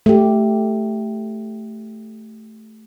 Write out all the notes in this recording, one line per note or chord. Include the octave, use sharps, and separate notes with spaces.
A3 G4